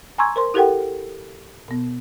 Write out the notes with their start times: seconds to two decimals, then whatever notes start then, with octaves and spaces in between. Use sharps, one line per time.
0.18 G#5 A#5 C6 C#6 E6 G#6
0.36 A#4 C5 C6
0.54 E4 G4 A4 A#4 F#5 G5
1.68 B2 B3